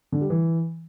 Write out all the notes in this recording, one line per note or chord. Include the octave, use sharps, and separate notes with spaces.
D3
G3
E3